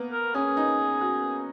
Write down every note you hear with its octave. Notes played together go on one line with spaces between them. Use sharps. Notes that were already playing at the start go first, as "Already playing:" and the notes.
Already playing: A#3 B3
A#4
C#4 G#4
D#4
F#4